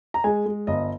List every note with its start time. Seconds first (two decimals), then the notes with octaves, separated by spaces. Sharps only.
0.14 A#5
0.24 G#3 G#5
0.46 G#3
0.67 G1 D#5